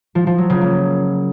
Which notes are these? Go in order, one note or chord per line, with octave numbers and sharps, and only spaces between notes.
F3
F3
F#3
C#3
A#3